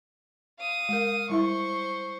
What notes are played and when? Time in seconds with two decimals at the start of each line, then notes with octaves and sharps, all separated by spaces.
0.59 F5 D#6
0.89 G#3 A#4
1.30 G3 E4 C5 E5 C#6